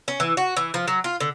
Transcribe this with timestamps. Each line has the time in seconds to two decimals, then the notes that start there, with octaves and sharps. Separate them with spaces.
0.08 C#4
0.20 E3
0.37 F#4
0.56 E3
0.74 F3
0.88 F#3
1.04 F4
1.20 D3